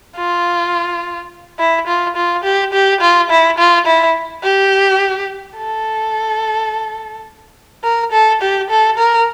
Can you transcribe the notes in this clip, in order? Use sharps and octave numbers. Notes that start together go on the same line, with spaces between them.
F4
E4
F4
F4
G4
G4
F4
E4
F4
E4
G4
A4
A#4
A4
G4
A4
A#4